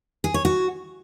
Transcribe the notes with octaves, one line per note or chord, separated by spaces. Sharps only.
G#4
C#5
F#4